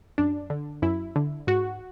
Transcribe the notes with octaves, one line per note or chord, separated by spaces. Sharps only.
F#2 D4
D3
F#2 E4
D3
G#2 F#4